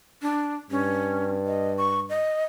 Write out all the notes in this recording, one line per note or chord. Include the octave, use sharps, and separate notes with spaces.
D4
G2 C#4
D#5
C#6
D#5